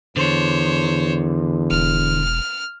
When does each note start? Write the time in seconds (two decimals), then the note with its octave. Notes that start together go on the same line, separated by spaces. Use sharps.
0.17 E2 D3 C5 C#5
1.71 E1 F6